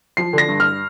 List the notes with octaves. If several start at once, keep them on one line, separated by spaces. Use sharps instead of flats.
F3 C7
D3 A#6
G2
F6